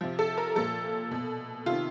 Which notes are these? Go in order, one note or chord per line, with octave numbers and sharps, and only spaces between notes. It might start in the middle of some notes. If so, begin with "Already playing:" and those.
C3 F3
A4
A#4
A#2 F3 A4
B2
C3 D#3 F4